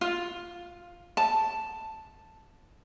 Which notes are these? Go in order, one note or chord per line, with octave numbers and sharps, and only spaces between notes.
F4
A5